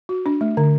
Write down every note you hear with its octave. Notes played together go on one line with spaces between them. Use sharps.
F#4
D4
A3
D3